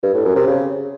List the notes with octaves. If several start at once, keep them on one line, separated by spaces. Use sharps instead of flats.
G2
A2
F#2
C3
C#3